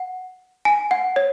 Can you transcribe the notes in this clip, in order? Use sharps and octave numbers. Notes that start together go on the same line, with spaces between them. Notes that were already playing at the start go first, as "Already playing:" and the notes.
Already playing: F#5
G#5
F#5
C#5